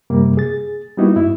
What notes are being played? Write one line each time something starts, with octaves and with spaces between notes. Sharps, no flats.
F#2 C3 G3 A#3
G#4 A6
G3 A#3 B3 D#4 E4 F#4
G2 E4